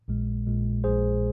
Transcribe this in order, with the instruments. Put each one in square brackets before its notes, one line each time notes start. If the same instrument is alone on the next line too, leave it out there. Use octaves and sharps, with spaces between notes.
[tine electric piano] A#1 A#2 G#3
A#1 A#2 G#3
A#1 A#2 G#3 G#4 C5